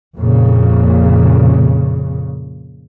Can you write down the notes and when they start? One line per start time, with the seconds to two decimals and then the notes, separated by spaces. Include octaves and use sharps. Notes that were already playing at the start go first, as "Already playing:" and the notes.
0.17 F2 A#2 C#3